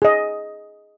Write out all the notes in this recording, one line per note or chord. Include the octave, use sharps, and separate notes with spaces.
G#4 D#5